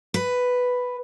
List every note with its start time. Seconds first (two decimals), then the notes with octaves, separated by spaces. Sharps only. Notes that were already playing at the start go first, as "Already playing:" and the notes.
0.14 B4